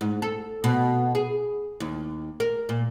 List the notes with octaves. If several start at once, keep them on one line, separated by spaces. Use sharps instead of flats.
G#2
A4
B2
G#4
D#2
A#4
A#2